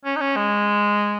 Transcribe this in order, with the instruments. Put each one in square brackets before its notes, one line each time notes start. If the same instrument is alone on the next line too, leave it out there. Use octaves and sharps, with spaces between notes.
[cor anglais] C#4
D#4
C#4
G#3